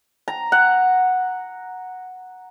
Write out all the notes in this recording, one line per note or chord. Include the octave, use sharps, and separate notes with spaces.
A#5
F#5